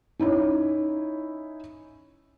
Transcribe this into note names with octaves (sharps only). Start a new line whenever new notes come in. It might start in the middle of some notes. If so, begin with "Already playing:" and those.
C#4 D#4 E4 C#5